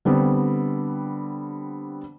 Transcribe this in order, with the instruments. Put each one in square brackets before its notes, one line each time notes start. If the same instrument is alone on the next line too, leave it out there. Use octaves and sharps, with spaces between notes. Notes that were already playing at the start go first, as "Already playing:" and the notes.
[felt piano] D3 G3 B3 C4